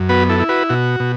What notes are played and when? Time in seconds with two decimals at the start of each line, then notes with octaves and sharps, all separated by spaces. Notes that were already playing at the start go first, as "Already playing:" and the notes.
Already playing: F#2
0.09 B3 F#4 B4
0.29 E4 A4
0.39 E4
0.49 F#4 B4
0.69 B2 F#4
1.00 B2